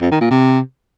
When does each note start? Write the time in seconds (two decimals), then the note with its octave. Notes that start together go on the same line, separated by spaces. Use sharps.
0.01 F2
0.11 D#3
0.21 A#2
0.31 C3